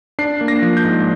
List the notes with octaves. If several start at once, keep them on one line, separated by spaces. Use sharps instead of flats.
D4 C7
A#3
A#6
F3
G6
G#2